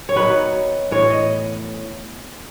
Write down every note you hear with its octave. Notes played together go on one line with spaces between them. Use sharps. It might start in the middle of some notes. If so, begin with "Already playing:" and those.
C#5
D#3 F#3 B3 B4
A2 E3 B3 C#5
D#5